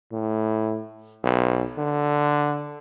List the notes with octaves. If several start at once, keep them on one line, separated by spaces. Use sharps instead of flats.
A2
B1
D3